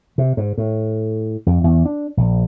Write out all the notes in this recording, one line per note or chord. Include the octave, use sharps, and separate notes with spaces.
C3
G#2
A2
F2
E2
D4
A#1